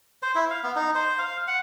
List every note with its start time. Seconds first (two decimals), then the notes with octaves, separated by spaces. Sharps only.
0.23 C5
0.35 E4
0.50 F5
0.64 B3
0.76 D#4
0.95 C5
1.19 F5
1.48 F#5